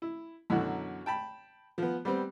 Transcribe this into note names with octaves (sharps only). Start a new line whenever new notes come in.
E4
F#2 B2 D3 E3 F#3
G5 A5 B5
F3 B3
G3 B3 C4